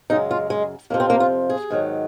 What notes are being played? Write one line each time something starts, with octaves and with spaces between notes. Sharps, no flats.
F#2 C#3 G#3 D#4
F4
G#3
F2 C3 F3 A#3
C4
A#3
F4
G#4
G#2 D#3 F#3